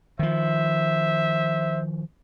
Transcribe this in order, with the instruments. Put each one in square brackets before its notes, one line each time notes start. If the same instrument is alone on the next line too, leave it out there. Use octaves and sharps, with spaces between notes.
[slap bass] D#3 F3 [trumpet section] C5 E5